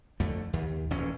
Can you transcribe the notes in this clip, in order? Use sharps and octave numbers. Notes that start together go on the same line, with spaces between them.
F2 D3 A3
D#2
E1 E2 A#2 C#4